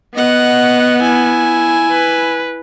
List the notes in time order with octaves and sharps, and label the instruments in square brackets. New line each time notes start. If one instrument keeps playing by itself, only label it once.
[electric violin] B3 [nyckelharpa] D#5 F#5
[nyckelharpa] E4 G#5
[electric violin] B4